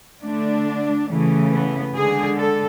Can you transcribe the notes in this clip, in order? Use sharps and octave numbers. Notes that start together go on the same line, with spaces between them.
D3 A3 D4
C#3 E3 A3
B3
D3 G#3 G#4
A4